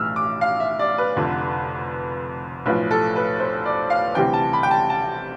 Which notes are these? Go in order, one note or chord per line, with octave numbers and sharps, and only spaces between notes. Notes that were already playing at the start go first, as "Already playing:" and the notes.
Already playing: B1 A2 E3 E6 F6
D6
F5
E5
D5
B4
F1 F2 D3
B1 A2 F3 B4
A4
B4
C5
D5
F5
D2 C3 E3 G3 G5
A5
B5
G5
A5
A5